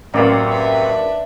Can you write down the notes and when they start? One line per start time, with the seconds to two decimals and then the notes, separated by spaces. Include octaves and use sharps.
0.14 A1 F#2 C3 A#3 D5 B5
0.48 B4 E5
0.90 D4